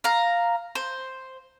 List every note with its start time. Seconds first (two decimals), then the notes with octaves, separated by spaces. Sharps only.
0.04 F5 A#5
0.75 C5